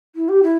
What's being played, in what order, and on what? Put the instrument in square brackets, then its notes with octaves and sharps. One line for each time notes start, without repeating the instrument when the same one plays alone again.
[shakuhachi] E4
G4
E4